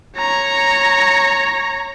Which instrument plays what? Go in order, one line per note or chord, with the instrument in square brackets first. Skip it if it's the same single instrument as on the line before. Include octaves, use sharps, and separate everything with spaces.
[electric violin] C#5 A#5